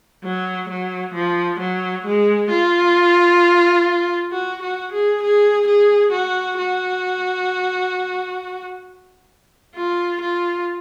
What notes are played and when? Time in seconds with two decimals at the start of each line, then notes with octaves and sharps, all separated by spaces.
0.24 F#3
0.69 F#3
1.14 F3
1.59 F#3
2.05 G#3
2.50 F4
4.32 F#4
4.62 F#4
4.92 G#4
5.23 G#4
5.67 G#4
6.12 F#4
6.58 F#4
9.75 F4
10.21 F4